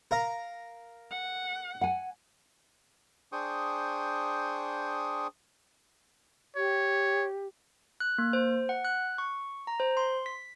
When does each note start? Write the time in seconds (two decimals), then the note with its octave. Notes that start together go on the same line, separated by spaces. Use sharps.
0.11 A#4 F5 A#5
1.11 F#5
1.81 F#5 G#5
3.32 D4 G#4 C5 G5 C#6 D#6
6.56 G4 C#5
8.00 F#6
8.18 A#3
8.33 C5
8.69 F#5
8.85 F#6
9.18 C#6
9.67 A#5
9.80 C5
9.97 C6
10.26 B6